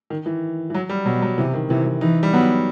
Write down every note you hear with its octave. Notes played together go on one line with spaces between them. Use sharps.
D#3
E3
E3
F#3
G3
B2 F#3
F#3
C3 E3
D#3
C3 E3
E3
E3 D#4
G3
F#3 B3